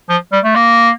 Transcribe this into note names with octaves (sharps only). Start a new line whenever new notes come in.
F3
G3
A3
A#3